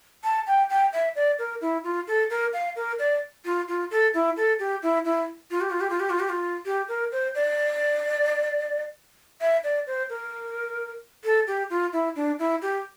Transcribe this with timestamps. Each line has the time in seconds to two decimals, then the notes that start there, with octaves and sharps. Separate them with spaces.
0.24 A5
0.47 G5
0.70 G5
0.93 E5
1.16 D5
1.39 A#4
1.61 E4
1.84 F4
2.08 A4
2.30 A#4
2.53 F5
2.76 A#4
2.99 D5
3.45 F4
3.68 F4
3.91 A4
4.14 E4
4.37 A4
4.59 G4
4.83 E4
5.05 E4
5.51 F4
5.61 G4
5.70 F4
5.81 G4
5.90 F4
6.00 G4
6.10 F4
6.20 G4
6.29 F4
6.66 G4
6.88 A#4
7.12 C5
7.35 D5
9.41 E5
9.64 D5
9.87 C5
10.10 A#4
11.24 A4
11.47 G4
11.70 F4
11.93 E4
12.16 D4
12.39 E4
12.62 G4